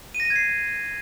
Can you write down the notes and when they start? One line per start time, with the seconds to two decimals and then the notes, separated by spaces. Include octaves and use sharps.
0.15 D#7
0.20 A#6
0.25 D#7
0.30 G#6
0.36 C7